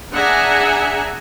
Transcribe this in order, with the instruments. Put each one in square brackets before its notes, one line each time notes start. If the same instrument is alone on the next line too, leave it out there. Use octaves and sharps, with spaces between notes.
[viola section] D4 G#4 E5 F#5 G#5 A#5